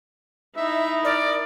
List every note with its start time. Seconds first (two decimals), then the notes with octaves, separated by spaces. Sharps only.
0.56 D#4 E4 E5
1.05 A#4 D5